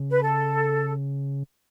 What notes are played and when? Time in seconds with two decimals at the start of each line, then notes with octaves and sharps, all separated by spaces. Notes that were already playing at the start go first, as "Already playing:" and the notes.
Already playing: C#3
0.10 B4
0.21 A4